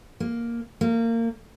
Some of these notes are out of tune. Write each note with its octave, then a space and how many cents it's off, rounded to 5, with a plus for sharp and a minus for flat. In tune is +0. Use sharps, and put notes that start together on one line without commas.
A#3 +5
A#3 -25